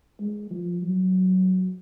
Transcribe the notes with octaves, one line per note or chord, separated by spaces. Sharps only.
G#3
F3
F#3